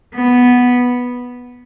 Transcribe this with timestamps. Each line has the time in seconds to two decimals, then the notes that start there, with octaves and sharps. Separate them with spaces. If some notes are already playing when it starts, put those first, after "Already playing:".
0.14 B3